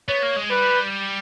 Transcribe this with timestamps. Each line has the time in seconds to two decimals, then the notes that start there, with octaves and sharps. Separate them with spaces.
0.08 B3 C#5
0.23 A#3
0.36 G#3
0.50 G3 B4